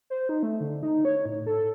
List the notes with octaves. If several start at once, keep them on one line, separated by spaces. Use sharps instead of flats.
C5
D#4
A3
D3
D#4
C#5
A2
A4